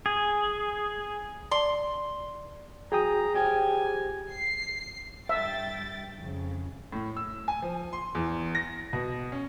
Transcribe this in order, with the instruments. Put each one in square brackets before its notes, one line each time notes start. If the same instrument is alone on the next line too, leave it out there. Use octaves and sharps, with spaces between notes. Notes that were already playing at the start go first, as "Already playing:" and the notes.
[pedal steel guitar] G#4
[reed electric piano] D5 [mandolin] C6
[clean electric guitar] F#3 [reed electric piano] G#4 G5 D#6 [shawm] A#5
[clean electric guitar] F3 G4 [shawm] G#5
[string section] C7
[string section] G2 G5 A6 [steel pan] E5
[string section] F2 C#3
[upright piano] A2
E6
G#5
F3
C6
E2
A#6
B2
C#4